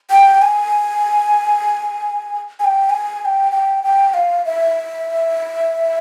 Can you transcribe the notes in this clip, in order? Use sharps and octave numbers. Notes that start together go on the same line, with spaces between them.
G5
G#5
G#5
G5
G#5
G#5
G5
G5
G5
F5
E5